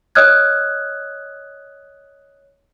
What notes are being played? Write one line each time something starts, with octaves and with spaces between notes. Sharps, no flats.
C#5 D#5 D#6 F6 F#6 G#6